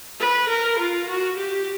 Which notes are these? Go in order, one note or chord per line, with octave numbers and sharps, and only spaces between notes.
B4
A#4
F4
F#4
G4